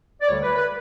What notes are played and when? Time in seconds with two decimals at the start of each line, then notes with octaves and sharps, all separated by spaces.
0.21 D5
0.27 D2 D3 G3 C#5
0.42 B4
0.55 B4